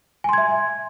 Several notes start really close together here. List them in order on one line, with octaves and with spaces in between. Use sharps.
G#5 C6 G#6 E5